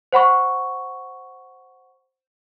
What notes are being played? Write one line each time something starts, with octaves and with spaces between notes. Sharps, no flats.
C5 F#5 B5 C#6